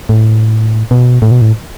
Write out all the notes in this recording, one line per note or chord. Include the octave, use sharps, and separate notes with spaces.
A2
B2
A2
B2
A2